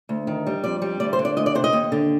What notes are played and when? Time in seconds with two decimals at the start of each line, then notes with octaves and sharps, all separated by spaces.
0.09 D2
0.27 D#3
0.47 G3
0.64 F2 D5
0.82 G3
1.00 D2 D5
1.13 C5
1.19 D3
1.25 D5
1.37 D2 D#5
1.46 D5
1.55 C3 C5
1.64 D#5
1.73 D#2
1.92 D3